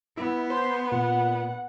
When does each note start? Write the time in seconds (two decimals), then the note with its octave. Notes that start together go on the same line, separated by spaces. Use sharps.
0.17 B3 E4
0.50 C5 C6
0.92 A#2 F#5